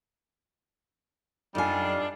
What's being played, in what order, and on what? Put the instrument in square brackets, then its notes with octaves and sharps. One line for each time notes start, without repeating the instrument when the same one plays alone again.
[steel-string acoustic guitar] F#2 G#5 [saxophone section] G3 D#4 [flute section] D4 F4 A4